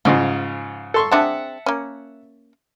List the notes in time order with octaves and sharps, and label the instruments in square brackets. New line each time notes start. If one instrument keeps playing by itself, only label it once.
[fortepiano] G#2 C#3 F4 [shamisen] F3 D#5
[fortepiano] A4 C6 C#6
[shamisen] C4 D4 G#4 [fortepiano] E5 F#5 A5
[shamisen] A#3 C#4